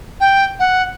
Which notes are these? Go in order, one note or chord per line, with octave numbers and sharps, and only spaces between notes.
G5
F#5